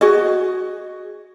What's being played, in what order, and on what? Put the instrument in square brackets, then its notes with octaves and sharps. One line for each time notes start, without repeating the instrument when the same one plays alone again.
[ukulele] F#4 G#4 D#5